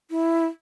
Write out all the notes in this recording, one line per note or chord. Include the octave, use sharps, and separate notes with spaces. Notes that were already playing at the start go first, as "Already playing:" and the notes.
E4